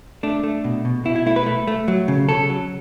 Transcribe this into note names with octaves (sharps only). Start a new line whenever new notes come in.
A3 D4
A3
B2
B2
B2 E4
E4
A3 E4
B4
A3
A3
F#3
C#3
C#3 A4
F#3